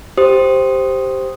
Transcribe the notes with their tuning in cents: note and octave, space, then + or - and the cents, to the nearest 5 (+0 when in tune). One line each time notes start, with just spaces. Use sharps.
G4 +0 C5 +0 D#6 +0